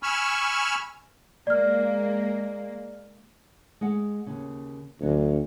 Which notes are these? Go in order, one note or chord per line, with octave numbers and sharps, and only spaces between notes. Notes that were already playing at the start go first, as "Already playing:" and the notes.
G#5 B5 C#6 E6 F6
G#3 A#3 D5 F6
G#3 F#5
D#2 C#3
D2 F#3 D4